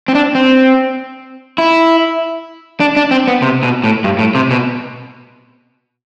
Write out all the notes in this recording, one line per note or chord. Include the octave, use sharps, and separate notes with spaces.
C4
D4
C4
E4
D4
D4
C4
B3
C3
B2
A2
G2
A2
C3
B2